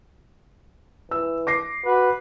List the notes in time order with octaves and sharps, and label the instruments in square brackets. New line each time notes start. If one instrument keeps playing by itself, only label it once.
[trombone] E3 [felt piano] E6
[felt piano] D6 A#6 C7
[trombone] F#4 [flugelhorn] B4